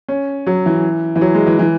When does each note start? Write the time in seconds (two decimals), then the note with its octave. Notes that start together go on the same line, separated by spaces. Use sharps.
0.08 C#4
0.47 F#3
0.66 E3
1.16 E3
1.21 F#3
1.34 G#3
1.47 E3
1.59 E3